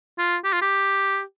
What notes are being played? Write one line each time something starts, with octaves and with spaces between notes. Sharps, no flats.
F4
G4
F4
G4